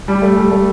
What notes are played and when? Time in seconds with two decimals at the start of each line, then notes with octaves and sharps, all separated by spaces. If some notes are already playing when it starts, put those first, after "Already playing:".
0.08 G3
0.22 A3
0.37 G3
0.52 A3